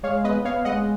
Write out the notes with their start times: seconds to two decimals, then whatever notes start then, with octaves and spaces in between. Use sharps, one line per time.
0.03 G#3 C#5 F5
0.24 B3 B4 D#5
0.44 B3 C#5 F5
0.65 G#3 D#5 F#5